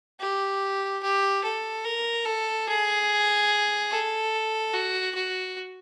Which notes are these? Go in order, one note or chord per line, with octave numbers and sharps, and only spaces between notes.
G4
G4
A4
A#4
A4
G#4
A4
F#4
F#4